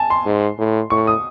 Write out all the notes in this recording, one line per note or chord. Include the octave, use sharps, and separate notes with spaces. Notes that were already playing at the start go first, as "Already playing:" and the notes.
Already playing: G#5 A5
C6
G#2
A2
A2 C#6
D#6